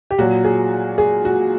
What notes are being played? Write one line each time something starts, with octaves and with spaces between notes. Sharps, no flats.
G4
A#2 F#3 F#4
G#4
G#4
F#4